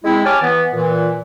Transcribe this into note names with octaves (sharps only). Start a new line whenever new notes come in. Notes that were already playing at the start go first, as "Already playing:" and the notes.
G#3 C4 E4
G4 C#5 G#5 A5 D6 F6
E3 B3
A#2 E3